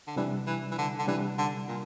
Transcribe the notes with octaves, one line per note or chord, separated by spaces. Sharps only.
D3
C3 E3 G3 D4
E3
E3
D3
D3
C3 E3 G3 D4
D3
A#2